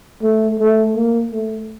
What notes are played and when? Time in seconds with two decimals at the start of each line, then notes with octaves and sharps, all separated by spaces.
0.22 A3
0.59 A3
0.95 A#3
1.31 A3